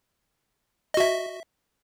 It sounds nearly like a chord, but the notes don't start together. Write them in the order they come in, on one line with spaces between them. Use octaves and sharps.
D#5 F#4 E5